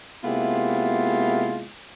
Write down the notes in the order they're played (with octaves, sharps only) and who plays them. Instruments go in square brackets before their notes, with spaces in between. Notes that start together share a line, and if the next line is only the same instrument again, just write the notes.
[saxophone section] C3 G#3 A#3 B3 E4 F4